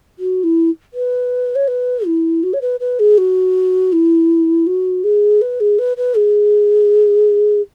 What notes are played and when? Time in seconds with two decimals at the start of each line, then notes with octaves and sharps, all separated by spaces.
0.19 F#4
0.43 E4
0.94 B4
1.55 C#5
1.68 B4
2.06 E4
2.43 F#4
2.53 C#5
2.61 B4
2.80 B4
2.99 G#4
3.18 F#4
3.92 E4
4.67 F#4
5.04 G#4
5.41 B4
5.60 G#4
5.79 B4
5.97 B4
6.16 G#4